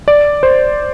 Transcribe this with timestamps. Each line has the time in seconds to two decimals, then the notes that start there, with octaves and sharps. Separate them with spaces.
0.08 D5
0.43 C5